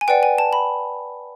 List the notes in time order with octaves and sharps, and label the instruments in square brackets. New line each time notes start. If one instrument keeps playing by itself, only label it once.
[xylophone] G#5
B4 D5 F#5 G5
G#5
A5
B5